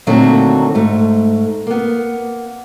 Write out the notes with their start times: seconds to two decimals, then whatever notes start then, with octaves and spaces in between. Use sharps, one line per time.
0.07 A#2 D3 D#3 F#3 A3 C4
0.75 G#2 A3
1.67 A#3 B3